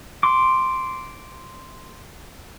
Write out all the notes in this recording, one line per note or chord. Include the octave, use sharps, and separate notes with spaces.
C6 D6